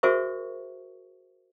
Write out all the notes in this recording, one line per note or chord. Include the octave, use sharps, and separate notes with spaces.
F#4 G#4 A#4 C5 E5 C#6